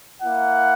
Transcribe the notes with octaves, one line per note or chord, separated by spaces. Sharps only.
A#3 E4 F#5